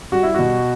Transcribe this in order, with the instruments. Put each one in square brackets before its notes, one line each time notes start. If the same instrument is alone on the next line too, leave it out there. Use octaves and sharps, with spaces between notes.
[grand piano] G3 F#4
E4
B2 F#4